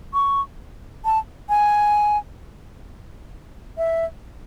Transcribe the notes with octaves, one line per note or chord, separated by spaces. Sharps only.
C#6
A5
G#5
E5